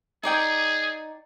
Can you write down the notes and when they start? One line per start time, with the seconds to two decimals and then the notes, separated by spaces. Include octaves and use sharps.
0.23 D#4 G#4 D5 G5